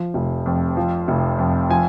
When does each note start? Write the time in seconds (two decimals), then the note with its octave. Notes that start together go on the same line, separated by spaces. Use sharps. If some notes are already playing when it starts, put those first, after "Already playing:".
Already playing: F3
0.14 F1
0.46 F2
0.77 F3
1.08 F1
1.39 F2
1.70 F3 G#5